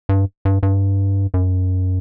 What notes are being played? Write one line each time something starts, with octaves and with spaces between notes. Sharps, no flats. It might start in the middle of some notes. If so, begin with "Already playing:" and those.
G2
G2
G2
F#2